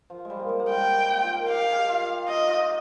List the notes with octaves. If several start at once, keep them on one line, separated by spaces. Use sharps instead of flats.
F3
G3 G#3
A#3
G#3
A#3
G3 G5
D#4
F4
A#4
G4 F5
G4
G#4
G4
F4
D#4 D#5
F4